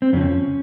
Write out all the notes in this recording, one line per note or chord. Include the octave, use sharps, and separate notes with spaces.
C4
F2 C#3 F3 C#4